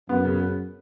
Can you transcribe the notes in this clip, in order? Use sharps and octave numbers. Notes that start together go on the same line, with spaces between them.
F#2 B3
C#3